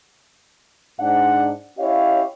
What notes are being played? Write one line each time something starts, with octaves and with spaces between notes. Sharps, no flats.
G#2 D4 F#5
C#4 E4 G4 C#5 D#5 F5